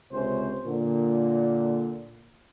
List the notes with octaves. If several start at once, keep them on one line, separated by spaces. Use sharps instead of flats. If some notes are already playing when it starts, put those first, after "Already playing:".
C#2 C3 C#4 C5
A#2 D3